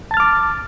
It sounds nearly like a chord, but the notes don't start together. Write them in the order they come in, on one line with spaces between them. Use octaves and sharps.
A5 A6 F6 D6